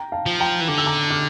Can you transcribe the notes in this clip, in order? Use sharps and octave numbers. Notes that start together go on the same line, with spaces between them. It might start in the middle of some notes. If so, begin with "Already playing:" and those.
Already playing: G5 A#5
F5 A5
F3
G5 A#5
E3
D3 D6
E6
A#5 D6
D6 F6